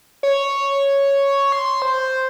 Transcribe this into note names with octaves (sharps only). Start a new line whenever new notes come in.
C#5
C6
C5